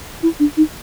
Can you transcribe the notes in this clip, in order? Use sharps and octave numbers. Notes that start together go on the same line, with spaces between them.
E4
D4
D#4